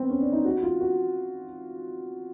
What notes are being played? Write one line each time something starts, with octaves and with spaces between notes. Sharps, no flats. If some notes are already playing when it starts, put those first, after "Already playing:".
Already playing: B3 C4
C#4
D4
D#4
F#4
F4
F#4